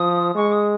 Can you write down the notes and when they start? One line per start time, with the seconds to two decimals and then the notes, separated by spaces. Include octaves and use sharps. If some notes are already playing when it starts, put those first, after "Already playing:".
Already playing: F3 D#6
0.35 G#3 C#6
0.52 D#6